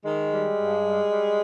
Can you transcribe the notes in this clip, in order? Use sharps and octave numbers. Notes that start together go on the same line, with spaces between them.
D#3 G#3
G3
G2
G3
G3